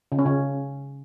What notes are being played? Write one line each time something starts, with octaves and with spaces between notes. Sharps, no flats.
C#3
C#4
C#3